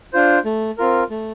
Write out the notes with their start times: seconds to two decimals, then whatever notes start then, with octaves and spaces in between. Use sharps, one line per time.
0.13 D4 F4 C5
0.45 A3
0.78 C4 F4 A#4
1.10 A3